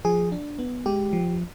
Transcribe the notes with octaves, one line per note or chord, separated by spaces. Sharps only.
F3 G#4
D4
B3
G#3 G4
F3